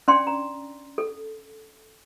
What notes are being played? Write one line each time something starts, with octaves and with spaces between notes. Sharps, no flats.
C#4 D4 D5 G5 C6
A#5
A4